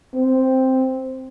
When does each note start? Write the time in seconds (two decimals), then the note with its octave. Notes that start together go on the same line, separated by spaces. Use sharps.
0.14 C4